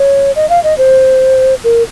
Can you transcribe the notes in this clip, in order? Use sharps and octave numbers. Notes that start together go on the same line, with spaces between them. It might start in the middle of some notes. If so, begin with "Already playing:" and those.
Already playing: C#5
D#5
F5
D#5
C5
A#4